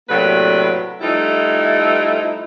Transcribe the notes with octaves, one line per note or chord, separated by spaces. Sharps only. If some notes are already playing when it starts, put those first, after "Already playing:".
A2 C3 F#3 A#3 D4 B4
F3 G3 A3 D#4 E4